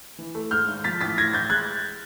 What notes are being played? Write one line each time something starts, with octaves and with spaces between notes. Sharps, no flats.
E3
A3
G#2 F6 G6
G#1
F3 A6 B6
A1 A6 B6
A2 G#6 A#6
A1 G6 A6
G#3 F#6 G#6